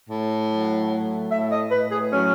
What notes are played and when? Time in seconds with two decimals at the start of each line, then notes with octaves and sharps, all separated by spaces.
0.09 A2
0.50 F#3
0.90 A3
1.31 A2 E5
1.52 D#5
1.71 A2 B4
1.92 G#4
2.12 F#3 C#4